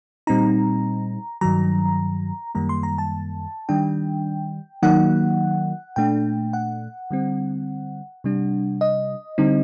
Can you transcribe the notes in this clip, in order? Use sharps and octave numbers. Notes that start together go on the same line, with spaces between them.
A#2 G3 C4 D#4 A#5
G2 D#3 F#3 A#5
F#2 D#3 G3 A#3 A#5
C6
A#5
A5
D#3 G3 D4 G5
D#3 F#3 A#3 D#4 F#5
A#2 A3 D4 G5
F#5
D3 G3 C4
C3 G3 D4
D#5
D3 G3 C4 D#4